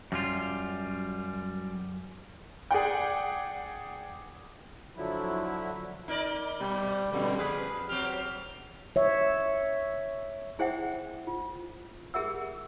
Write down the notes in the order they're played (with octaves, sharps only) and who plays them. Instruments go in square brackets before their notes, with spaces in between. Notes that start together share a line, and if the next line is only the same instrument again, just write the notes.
[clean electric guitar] F#2 G3 F4
[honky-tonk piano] G#4 D5 F#5 G5
[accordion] D3 F3 F#3 E4
[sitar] D#4 A#4 D5
[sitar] B2 [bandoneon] G3
[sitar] F2 [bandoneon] B2 D3 G3
[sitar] F3 B4 [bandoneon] G#4
[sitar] F#3 C4 G4 [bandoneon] F6
[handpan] C#5 E5
[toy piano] E4 G#4 C5 E5 F#5 G5
F4
G4 G#4 A#4 E5 F#5 E6